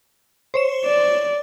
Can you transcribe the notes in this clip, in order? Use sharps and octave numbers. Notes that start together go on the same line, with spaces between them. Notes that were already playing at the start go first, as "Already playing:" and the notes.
C5 C#5 E7
D5